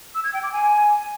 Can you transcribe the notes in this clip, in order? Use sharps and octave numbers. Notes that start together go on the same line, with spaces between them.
E6
G#6
G5
D6
G#5